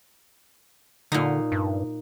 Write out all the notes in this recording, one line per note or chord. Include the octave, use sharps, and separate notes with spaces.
A#2 D3 D#4
G2